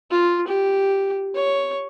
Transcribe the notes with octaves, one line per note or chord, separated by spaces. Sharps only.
F4
G4
C#5